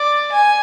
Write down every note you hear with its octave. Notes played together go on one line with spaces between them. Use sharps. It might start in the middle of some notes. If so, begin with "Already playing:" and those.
Already playing: D5
G#5